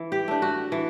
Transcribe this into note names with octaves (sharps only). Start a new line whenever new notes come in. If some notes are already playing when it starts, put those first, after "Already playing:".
Already playing: E3
G4
A3 D4
F#4
E3